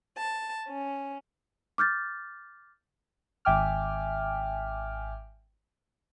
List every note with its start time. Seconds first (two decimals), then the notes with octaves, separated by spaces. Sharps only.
0.18 A5
0.69 C#4
1.78 D6 F6 G6 A6
3.45 G#1 E5 G5 G#5 D6 F6